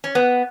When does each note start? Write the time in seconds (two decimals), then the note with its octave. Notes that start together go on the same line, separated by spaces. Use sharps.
0.04 C#4
0.15 B3